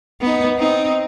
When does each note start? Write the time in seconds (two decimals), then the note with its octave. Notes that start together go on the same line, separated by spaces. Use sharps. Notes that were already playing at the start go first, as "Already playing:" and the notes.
0.21 B3 D#4
0.57 C4 D#4